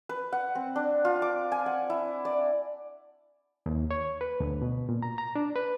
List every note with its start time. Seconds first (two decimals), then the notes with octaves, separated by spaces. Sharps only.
0.09 B4
0.33 F#5
0.55 C4
0.76 D4
1.05 F4
1.22 D6
1.52 G#5
1.66 F#5
1.90 E4
2.25 D5
3.66 D#2
3.91 C#5
4.21 B4
4.40 D2
4.62 B2
4.89 A#2
5.02 A#5
5.18 A#5
5.36 D4
5.55 B4